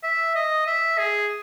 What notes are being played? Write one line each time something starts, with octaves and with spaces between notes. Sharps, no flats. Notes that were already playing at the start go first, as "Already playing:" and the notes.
E5
D#5
E5
G#4